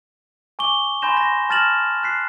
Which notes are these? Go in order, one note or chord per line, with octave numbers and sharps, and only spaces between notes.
G#5 C#6 D6 G7
G#5 B5 C6 G6 A#6 E7
A#6
A5 F6 A6 A#6 E7 F#7
F#6 B6 C7